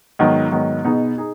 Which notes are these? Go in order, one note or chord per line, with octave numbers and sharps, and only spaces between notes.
G#2 D#3 F#3 B3
G#2 D#3 F#3 B3
B2 B3 D#4 G#4
D#4 G#4